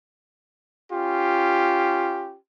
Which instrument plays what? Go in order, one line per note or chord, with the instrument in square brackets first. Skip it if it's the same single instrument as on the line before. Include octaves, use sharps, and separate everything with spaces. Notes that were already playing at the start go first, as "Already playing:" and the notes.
[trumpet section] C#4 F4 G4